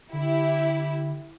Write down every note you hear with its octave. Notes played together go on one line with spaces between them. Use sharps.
D3 E4 G4